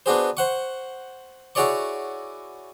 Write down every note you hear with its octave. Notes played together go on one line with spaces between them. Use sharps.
B3 D4 F#4 G#4 C5
C5 F#5 C#6
E4 F#4 G#4 C#5 D5 C#6